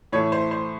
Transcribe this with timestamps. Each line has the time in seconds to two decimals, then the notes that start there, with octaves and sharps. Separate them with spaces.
0.12 A2 E3 A3 C#5
0.32 C5
0.51 C5